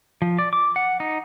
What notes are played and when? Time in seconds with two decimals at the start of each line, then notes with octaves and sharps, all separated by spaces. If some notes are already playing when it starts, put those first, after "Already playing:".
0.22 F3
0.39 D5
0.53 D6
0.76 F#5
1.00 D#4